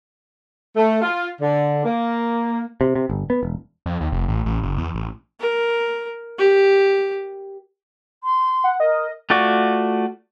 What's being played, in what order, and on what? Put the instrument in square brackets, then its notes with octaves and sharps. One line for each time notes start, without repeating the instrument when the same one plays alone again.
[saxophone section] A3
F4
D3
A#3
[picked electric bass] C3
C3
G1
B3
E1
[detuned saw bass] F2
D#2
F1
A1
A1
F#1
E2
A1
[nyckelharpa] A#4
G4
[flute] C6
[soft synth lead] F#5
[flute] A#4 [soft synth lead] D#5
[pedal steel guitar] A3 F4 F#4 D5 C#6